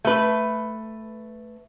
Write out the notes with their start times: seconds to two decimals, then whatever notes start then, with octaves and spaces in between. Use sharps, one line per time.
0.05 A3 B4